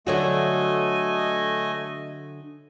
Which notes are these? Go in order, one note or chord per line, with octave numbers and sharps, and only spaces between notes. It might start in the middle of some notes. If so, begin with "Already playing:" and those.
D3 F#3 A3 F#4 D#5 G#5